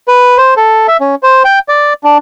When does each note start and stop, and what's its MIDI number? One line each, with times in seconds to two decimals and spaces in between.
0.08 0.38 71
0.38 0.54 72
0.57 0.87 69
0.88 0.97 76
1.01 1.15 61
1.23 1.43 72
1.44 1.59 79
1.68 1.93 74
2.04 2.18 62